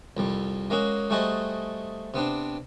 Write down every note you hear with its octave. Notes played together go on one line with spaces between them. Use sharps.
C2 F2 G3
G#3 A#3 C#4 F#4 G#4
G3 A3 F#4 G#4 C5 D#5
C3 B3 C4 D4